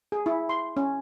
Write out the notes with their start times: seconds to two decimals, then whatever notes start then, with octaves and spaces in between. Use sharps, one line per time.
0.12 G#4
0.26 E4
0.49 C6
0.77 C#4